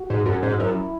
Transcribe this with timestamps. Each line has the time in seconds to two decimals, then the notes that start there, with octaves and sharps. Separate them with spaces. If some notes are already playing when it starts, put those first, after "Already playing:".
Already playing: F#4
0.10 G#2
0.26 F#2
0.43 G#2
0.59 F#2 E4